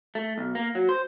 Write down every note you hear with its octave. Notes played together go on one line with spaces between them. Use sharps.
A3
B1
A#3
F#3
C5